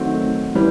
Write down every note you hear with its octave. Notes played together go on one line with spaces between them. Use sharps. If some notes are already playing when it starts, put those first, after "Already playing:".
Already playing: D#3 F#3 A3 C4
E3 G3